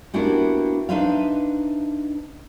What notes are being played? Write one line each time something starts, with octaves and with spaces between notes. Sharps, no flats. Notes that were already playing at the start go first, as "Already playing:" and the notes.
A#3 B3 D4 E4 F#4 G4
D4 D#4 B4 C5 E5 F5